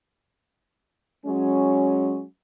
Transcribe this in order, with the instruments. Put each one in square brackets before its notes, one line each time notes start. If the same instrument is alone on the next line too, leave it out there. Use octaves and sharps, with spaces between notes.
[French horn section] F#3 G#3 C#4